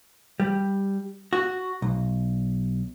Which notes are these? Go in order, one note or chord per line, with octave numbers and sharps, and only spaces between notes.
G3
F#4
B1